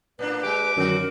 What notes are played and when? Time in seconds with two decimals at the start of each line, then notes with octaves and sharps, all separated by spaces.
0.19 A2 A#3 D4 B4
0.43 G#3 A#3 G4 D6
0.77 F#2 D3 F#4 A#4